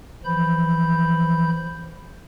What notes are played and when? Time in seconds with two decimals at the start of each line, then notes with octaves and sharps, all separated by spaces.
0.25 E3 F3 B5 G6